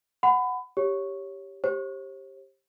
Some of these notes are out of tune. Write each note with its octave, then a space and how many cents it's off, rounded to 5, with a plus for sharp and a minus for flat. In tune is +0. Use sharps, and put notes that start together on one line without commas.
F#5 +0 B5 +25
G4 +0 C#5 +0
G4 +0 C5 +45